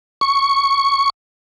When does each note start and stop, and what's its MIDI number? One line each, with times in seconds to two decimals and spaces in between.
0.21 1.10 85